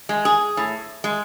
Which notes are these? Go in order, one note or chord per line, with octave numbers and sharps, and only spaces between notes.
G#3
G#4
A2
G#3